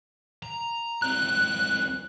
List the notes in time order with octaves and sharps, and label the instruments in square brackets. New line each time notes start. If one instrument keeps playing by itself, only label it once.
[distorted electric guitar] A#5
[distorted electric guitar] C#2 C4 [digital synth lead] F#6